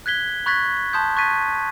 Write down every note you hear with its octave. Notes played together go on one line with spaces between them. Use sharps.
F#6 G#6 B6 G7
B5 C#6 F#6 G#6 A6 B6
A5 C6 D#6 G6
C#6 F#6 G#6 A6 B6 D#7